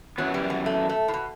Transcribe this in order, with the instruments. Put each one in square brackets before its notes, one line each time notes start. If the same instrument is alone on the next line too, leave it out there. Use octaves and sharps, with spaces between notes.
[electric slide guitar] F#2 E3 B3 [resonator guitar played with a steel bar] F#3
[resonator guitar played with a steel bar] G3
G3
A3
A3
A2
B2